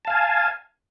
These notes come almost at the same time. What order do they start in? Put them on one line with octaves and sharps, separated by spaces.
A5 F5 G#5